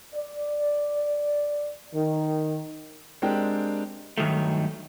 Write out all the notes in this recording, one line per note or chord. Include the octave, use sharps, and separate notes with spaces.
D5
D#3
G#3 C4 D4 G4 A#4
G2 D#3 F#3 A3